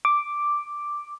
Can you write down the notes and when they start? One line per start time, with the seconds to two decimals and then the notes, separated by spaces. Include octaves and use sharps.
0.05 D6